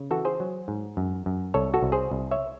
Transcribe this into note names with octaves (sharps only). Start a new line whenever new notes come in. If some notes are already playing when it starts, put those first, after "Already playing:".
Already playing: C#3
E3 F#4 A4
G#4 C5
F#3
G#2
F#2
F#2
C2 A4 C#5
F#4 A4
C2
G#4 C5
C2
C#5 E5